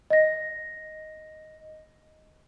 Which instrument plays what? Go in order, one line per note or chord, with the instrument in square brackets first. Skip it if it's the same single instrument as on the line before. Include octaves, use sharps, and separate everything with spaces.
[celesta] D#5 A#6